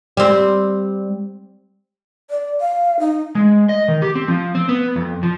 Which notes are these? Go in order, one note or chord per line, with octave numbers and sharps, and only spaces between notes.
G3 C4
D5
F5
D#4
G#3
D#5
D#3
G4
C4
F3
C4
B3
F2
F3